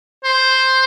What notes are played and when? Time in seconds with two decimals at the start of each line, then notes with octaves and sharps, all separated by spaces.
0.24 C5